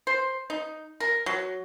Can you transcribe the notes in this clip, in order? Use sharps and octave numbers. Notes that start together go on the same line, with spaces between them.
C5
D#4
A#4
F#3